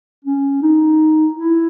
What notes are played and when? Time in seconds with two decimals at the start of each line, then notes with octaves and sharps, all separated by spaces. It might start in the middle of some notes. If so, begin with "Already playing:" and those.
0.25 C#4
0.62 D#4
1.34 E4